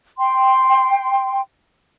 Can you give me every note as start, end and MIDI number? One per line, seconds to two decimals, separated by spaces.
0.18 1.40 79
0.18 1.40 84